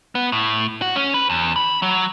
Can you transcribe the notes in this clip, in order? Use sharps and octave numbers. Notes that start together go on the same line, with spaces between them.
B3
A2
F#4
C#4
B4
E2
B5
F#3